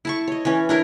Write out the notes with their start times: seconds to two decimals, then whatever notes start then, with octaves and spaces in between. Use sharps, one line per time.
0.05 E4 A5 C#6
0.28 C#5 D#5
0.45 E3 C#4
0.69 D4 E4 A#4